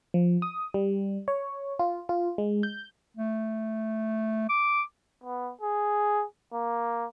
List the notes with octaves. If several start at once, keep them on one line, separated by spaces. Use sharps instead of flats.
F3
D#6
G3
C#5
F4
F4
G#3
G6
A3
D6
B3
G#4
A#3